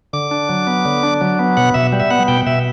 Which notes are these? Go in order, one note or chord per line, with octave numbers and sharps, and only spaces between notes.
D3 D6
D4
F#3
B3
D3
D4
F#3
B3
B2 F#5
B2 E5
G3
E5
B3 F#5
B2 G5
B2 E5